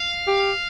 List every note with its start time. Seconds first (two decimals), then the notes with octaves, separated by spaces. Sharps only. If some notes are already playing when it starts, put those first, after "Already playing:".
Already playing: F5
0.27 G4